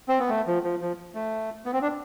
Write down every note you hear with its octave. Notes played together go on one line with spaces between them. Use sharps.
C4
B3
A3
F3
F3
F3
A3
B3
C4
D4